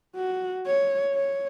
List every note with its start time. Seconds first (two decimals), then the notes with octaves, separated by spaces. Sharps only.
0.16 F#4
0.66 C#5
1.15 C#5